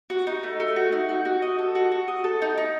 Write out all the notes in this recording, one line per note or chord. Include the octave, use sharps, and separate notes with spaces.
F#4
D#4
A3
A3
F#4
D#4
F#4
F#4
D#5
A4
F#4
F#4
D#5
A4
D#4
D#4